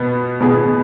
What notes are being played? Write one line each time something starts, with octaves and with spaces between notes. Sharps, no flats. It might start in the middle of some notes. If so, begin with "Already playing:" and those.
Already playing: B2 B3
B2 B3 G#4